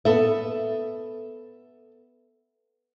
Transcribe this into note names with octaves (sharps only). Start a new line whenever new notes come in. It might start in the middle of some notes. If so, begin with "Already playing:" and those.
B3 A4 E5